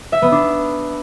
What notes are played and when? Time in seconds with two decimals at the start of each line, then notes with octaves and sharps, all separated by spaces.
0.12 E5
0.22 B3
0.32 D4